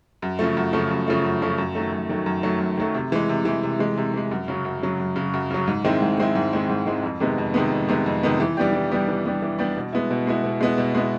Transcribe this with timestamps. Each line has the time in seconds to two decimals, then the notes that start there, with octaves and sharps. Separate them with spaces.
0.22 F#2
0.39 C#3 F3 A3
0.57 F#2
0.73 C#3 F3 A3
0.91 F#2
1.08 C#3 F3 A3
1.25 F#2
1.42 C#3 F3 A3
1.58 F#2
1.75 D#3 F#3 A3
1.92 F#2
2.09 D#3 F#3 A3
2.26 F#2
2.43 D#3 F#3 A3
2.60 F#2
2.77 D#3 F#3 A3
2.94 C3
3.12 E3 G#3
3.29 C3
3.45 E3 G#3
3.63 C3
3.79 E3 G#3
3.98 C3
4.14 E3 G#3
4.31 F#2
4.48 C#3 F#3
4.65 F#2
4.82 C#3 F#3
5.00 F#2
5.16 C#3 F#3
5.34 F#2
5.51 C#3 F#3
5.67 G#2
5.84 D#3 G#3 C4 E4
6.02 G#2
6.18 D#3 G#3 C4 E4
6.35 G#2
6.53 D#3 G#3 C4 E4
6.69 G#2
6.87 D#3 G#3 C4 E4
7.03 F2
7.20 C3 D#3 G#3 B3
7.38 F2
7.54 C3 D#3 G#3 B3
7.72 F2
7.88 C3 D#3 G#3 B3
8.06 F2
8.23 C3 D#3 G#3 B3
8.40 E3
8.57 G3 B3 D4 G4
8.73 E3
8.91 G3 B3 D4 G4
9.08 E3
9.25 G3 B3 D4 G4
9.42 E3
9.58 G3 B3 D4 G4
9.77 B2
9.93 G#3 B3 E4
10.11 B2
10.27 G#3 B3 E4
10.44 B2
10.60 G#3 B3 E4
10.78 B2
10.95 G#3 B3 E4